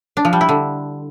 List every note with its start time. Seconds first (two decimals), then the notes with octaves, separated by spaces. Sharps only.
0.17 D4
0.25 F3
0.33 G3
0.41 E4
0.49 D3